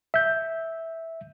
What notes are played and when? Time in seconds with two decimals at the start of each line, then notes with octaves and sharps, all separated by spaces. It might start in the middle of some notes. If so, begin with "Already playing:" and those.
0.14 E5 G6